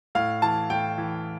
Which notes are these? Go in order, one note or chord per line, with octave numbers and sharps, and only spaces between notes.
A2 F5
E3 A5
A2 G5
E3